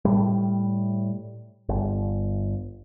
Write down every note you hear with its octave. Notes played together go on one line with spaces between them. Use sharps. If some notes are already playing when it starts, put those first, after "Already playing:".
A2 G3
G1